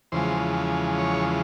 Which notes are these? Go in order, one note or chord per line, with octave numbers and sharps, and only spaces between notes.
E2 C#3 F3 G#3 C5
C#5